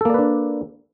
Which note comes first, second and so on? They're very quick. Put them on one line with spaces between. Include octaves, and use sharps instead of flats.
A4 A#3 D5 B4 D4